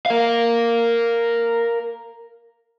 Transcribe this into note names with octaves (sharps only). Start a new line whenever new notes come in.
A#4 F5